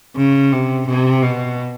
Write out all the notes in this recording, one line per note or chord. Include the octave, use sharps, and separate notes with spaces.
C#3
C3
C3
B2